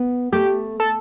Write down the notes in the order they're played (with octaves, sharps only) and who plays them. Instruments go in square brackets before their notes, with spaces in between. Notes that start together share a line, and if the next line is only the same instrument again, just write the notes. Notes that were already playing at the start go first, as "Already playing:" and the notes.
Already playing: [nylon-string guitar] B3
[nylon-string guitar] A3 [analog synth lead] G4
[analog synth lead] A4